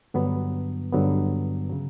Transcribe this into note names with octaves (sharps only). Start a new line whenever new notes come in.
G2 D3 F#3 B3
G2 D3 F#3 B3
C#3 F#3